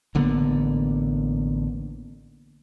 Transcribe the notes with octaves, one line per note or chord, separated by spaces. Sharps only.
A1 D3 A#3 B3